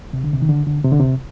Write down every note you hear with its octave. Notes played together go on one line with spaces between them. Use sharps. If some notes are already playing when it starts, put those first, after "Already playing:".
C3
D3
C3
D#3
D3
D3
C3
D3
C3